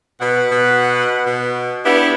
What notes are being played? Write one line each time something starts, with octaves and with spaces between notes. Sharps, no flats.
B2 B4 F#5
B2
B2
B3 D4 E4 G4